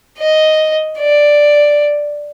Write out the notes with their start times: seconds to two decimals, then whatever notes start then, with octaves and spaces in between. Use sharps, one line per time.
0.18 D#5
0.99 D5